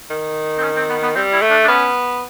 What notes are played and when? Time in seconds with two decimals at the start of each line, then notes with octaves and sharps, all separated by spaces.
0.10 D#3
0.58 C4
0.63 C#4
0.76 C4
0.89 B3
1.03 B3
1.15 G3 C4
1.33 E4
1.42 A3
1.50 D4
1.64 D4
1.68 B3 C#4